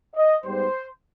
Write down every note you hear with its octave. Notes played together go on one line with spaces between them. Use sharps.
D#5
G#2 G3 B3 C5